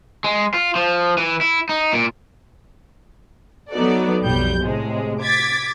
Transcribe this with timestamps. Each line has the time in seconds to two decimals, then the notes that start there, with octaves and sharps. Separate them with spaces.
0.24 G#3
0.54 F4
0.76 F3
1.18 E3
1.41 E4
1.69 D#4
1.93 A#2
3.71 F#3 B3 D#4 F#4 A4 D5
4.23 B1 F2 G3 G6
4.63 A2 C3 G#3
5.23 D6 G#6 A6 B6